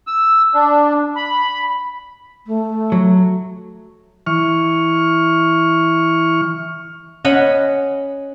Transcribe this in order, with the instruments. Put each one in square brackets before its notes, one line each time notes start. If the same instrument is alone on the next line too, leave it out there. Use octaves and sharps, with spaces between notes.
[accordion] E6
D4
B5
[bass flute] A3
[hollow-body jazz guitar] F#3
[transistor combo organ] E3 C#6 F6
[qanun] C#4 D#5 F#5 B5